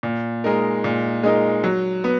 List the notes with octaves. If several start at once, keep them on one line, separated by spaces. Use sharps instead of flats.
A#2
G#3 D#4 A#4
A#2
G#3 D#4 A#4
F#3
B3